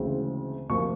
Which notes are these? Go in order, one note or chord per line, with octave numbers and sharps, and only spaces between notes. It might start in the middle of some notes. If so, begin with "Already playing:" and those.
Already playing: D2 C#3 E3 G#3 C4
D2 C3 F3 A#3 C#6